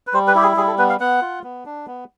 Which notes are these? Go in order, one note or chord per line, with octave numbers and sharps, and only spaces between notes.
B4
G3 C5
B4
E4 G4
G#4
G3 G#4
A4
B3 B4
F5
B3 F#5
F4
B3
D4
B3